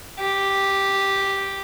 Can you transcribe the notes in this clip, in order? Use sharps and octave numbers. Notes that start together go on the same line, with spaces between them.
G4